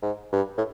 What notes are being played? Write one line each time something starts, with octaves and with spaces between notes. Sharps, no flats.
G#2
G2
A2